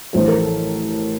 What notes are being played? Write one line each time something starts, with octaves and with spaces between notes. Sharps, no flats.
A1 A2 F3 C5
A#4
A4